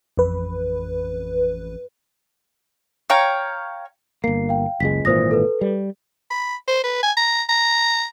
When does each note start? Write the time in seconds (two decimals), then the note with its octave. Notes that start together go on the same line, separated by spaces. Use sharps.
0.17 A1 F2 B4
3.10 C#5 F5 G5 A#5
4.24 G1 A#3 C7
4.49 F5 G5
4.80 F#1 C#2 G#3 B6
5.05 G#1 A#2 E3 C5 D#6 A#6
5.31 A4 B4
5.61 G3
6.30 B5
6.68 C5
6.83 B4
7.03 G#5
7.17 A#5
7.49 A#5